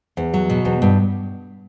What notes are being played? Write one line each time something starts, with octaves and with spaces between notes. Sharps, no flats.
E2
F#3
B2
E2
G2